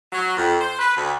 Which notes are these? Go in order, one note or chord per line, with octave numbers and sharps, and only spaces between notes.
F#3
F2
C5
B4
D2